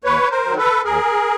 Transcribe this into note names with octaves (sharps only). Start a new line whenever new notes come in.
D#2 B4 C#5
A#4 C5
D#3 F#3
A4 B4
D#2 G#4 A#4